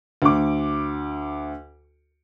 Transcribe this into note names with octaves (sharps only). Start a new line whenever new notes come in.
D2 D6